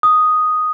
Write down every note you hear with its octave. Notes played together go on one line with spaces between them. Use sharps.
D#6